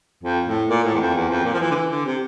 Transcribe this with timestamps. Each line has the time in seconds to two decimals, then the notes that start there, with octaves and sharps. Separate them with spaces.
0.23 F2
0.47 A2
0.69 A#2
0.84 A2
0.95 E2
1.00 F2
1.15 E2
1.30 F2
1.45 A#2
1.53 F3
1.60 E3
1.71 D3
1.75 E3
1.91 D3
2.05 C3